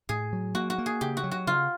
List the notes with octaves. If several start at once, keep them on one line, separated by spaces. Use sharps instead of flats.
A2 G#4
F#3
A#3 F#4
F#4
A#3
G#4
C#3 G4
F#4
F#3
F#4
C#3 F4